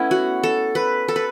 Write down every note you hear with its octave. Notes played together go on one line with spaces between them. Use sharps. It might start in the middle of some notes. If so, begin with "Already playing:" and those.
Already playing: A3 B3 C#4 E4
F#4
A4
B4
A4
B4